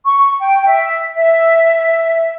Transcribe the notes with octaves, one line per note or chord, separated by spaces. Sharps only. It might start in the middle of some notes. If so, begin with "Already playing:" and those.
C#6
G5
E5
E5